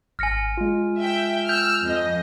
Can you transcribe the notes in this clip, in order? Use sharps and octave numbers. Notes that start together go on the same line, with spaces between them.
G#1 G#5 F6 A#6 C#7
G#3 F4
E5 G5
E6 F6 G6
F2 D#5